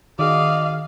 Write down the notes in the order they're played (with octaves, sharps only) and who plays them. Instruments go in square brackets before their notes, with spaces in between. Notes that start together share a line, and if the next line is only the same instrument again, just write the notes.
[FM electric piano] D#3 G#4 [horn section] F#4 D5 D#5 [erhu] F5